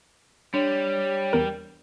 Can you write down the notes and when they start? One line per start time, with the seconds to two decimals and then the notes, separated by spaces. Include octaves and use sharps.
0.54 G3 D4 C#5
1.33 E2 A#4